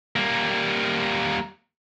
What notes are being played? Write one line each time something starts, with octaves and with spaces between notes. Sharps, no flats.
G3 A#3